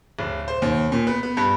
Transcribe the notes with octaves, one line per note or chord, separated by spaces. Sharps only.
D1
C5
D#2
A#2
B3
B3
G2